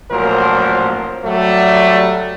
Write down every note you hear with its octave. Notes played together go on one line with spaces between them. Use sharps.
A1 A#2 F3 F#3 A#4 C5
F#3 G3 A3